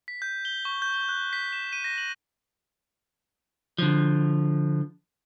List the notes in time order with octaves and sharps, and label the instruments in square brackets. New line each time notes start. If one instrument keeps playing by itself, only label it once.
[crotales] B6
G6
G7
C#6
G6
G7
F#6
B6
E7
D#7
A#6
F#7
[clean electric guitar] D3 F3